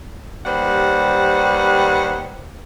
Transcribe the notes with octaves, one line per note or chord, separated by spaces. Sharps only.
D#2 G3 B4 C5 F#5